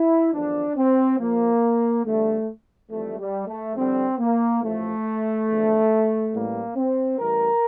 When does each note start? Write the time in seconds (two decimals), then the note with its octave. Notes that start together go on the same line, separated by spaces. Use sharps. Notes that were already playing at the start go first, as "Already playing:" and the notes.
Already playing: E4
0.33 E2 D3 F3 D4
0.77 C4
1.19 A#1 A#2 F3 A#3
2.04 E2 D3 G3 A3
2.91 F2 E3 G3 A3
3.19 G3
3.47 A3
3.76 F2 D3 G3 C4
4.19 A#3
4.62 A1 A2 F3 A3
5.48 E2 D3 F3
6.33 A1 A2 E3 G3 A#3
6.76 C4
7.19 A1 A2 E3 G3 A#4